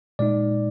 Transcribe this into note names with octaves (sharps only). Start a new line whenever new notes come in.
A#2 G#3 D#4 D5